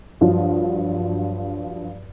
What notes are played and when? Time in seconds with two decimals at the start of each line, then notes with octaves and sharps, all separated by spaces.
0.21 G2 F3 F#3